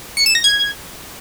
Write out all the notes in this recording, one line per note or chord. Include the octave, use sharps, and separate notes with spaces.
C#7
E7
A#6
G#6